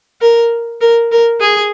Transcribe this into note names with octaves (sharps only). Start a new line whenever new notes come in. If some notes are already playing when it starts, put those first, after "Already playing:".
A#4
A#4
A#4
G#4